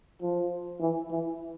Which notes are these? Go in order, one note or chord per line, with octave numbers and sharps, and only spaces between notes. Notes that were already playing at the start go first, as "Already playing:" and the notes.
F3
E3
E3